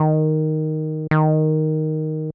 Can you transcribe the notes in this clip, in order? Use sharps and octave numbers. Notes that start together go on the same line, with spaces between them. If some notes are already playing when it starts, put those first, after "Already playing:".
Already playing: D#3
D#3